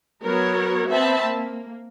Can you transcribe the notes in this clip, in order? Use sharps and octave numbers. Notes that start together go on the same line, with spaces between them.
F#3 B3 A#4 C#5
B3 C4 E5 A5 B5
A#3